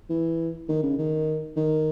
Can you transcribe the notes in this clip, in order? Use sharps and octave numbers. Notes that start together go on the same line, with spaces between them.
E3
D#3
C#3
D#3
D#3